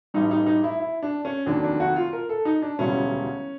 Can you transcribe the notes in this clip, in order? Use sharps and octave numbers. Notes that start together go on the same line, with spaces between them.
A1 G2 E3 G3 D#4
D#4
D#4
E4
E4
D4
C#4
F1 D#2 D#3 F#3 D4
D4
F#4
F4
A#4
A4
D#4
D4
E1 D2 C#3 E3 G3 C#4